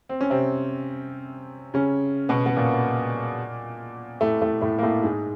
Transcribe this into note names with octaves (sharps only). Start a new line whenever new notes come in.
C4
C#4
C3 C4
C#3 C#4
B2 B3
B3
A#2 A#3
A2 A3
A2 A3
A2 A3
A#3
A2 A3
G#2 G#3